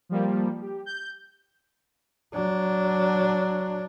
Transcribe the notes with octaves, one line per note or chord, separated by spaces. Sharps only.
F3 G3 A#3
G4
G6
F#3 D4